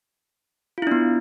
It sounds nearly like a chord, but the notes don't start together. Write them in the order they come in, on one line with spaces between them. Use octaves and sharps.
F4 E4 D4 B3